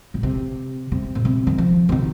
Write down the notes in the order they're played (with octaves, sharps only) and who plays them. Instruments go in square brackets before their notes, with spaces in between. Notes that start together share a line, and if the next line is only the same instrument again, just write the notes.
[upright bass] A#2
C3
C3
A#2
C3
D#3
F3
C3
D#3